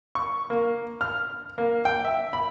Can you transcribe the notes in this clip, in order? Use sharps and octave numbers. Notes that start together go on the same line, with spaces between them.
C#6
A#3
F6
A#3
G5
E5
B5